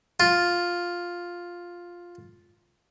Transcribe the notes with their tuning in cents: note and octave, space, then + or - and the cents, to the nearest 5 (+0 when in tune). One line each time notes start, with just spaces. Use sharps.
F4 +5